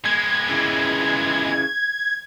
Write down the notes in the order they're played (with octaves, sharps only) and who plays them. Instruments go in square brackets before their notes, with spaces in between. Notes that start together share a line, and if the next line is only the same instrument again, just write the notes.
[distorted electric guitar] G#3 B3 [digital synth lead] G#6
[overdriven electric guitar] C#3 E3